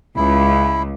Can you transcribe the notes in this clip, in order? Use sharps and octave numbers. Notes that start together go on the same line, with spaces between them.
C#2 E4